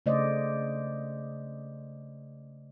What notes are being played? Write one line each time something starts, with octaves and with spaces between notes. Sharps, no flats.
C#3 A3 C5 D5 D#5